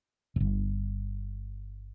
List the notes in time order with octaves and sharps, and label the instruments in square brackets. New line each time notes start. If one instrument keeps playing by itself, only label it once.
[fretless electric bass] D1 G1